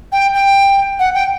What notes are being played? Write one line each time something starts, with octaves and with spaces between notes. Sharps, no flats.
G5
G5
F#5
G5